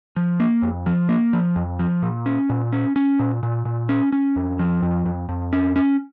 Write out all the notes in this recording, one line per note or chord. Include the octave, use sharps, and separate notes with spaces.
F3
A#3
F2
F3
A#3
F3
F2
F3
A#2
C#4
A#2
C#4
C#4
A#2
A#2
A#2
C#4
C#4
F2
F3
F2
F2
F2
C#4
C#4